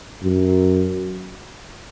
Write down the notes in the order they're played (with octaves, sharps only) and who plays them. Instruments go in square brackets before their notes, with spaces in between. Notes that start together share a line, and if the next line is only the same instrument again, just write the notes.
[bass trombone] F#2